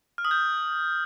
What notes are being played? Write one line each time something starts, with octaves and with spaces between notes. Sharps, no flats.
F6
D#6
G6